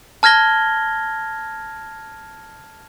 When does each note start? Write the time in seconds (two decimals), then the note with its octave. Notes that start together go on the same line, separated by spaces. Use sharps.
0.23 A5 F6 G#6 A#6 G7